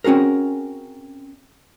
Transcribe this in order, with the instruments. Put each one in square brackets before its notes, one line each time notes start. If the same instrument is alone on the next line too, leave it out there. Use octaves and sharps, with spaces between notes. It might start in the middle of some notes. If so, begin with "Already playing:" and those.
[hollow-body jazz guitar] C4 C#4 F#4 G#4 A#4